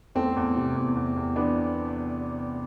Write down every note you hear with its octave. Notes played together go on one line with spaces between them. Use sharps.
E2 A3 C4
E2
C3
E2
E2
E2
E3 B3 D4